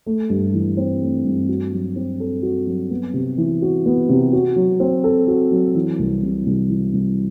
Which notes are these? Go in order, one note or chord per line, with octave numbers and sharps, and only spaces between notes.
A3
G2
E3
C4
A3
G2
F#4
F#3
C4
A4
F#4
F#3
B3
C3
E3
F#4
B3
C3
F#4
F#3
C4
A4
F#4
F#3
E3
C2
C3
C2
E3
C2